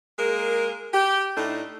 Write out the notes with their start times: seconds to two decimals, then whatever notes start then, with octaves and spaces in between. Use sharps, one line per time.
0.18 G#3 A#3 G#4 A#4
0.94 G4
1.37 A2 A3 D4 D#4